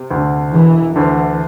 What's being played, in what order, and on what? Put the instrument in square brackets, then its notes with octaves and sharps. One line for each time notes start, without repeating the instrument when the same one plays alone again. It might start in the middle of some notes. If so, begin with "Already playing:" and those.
Already playing: [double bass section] C3
[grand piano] D2
D3
[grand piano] E1 [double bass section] E3
[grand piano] D2 D3 [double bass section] E3